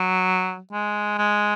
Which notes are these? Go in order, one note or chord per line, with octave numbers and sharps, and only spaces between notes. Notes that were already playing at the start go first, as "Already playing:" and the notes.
Already playing: F#3
G#3
G#3